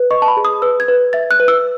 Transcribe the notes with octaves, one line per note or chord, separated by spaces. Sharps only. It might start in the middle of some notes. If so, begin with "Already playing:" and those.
Already playing: B4
D#5 C#6
A5
B5
G#4
D#6
B4 E6
G#6
B4
E5 A6
F#6
B4
E6